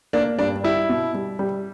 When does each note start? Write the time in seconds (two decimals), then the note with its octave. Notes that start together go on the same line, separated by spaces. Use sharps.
0.13 A#3 D4
0.39 G2 D4
0.64 G3 E4
0.89 B2
1.14 G3
1.39 G3